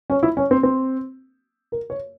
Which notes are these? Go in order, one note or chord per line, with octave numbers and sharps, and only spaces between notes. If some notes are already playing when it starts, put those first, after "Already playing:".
C#4
E4
C#4
C4
C4
A#4
C#5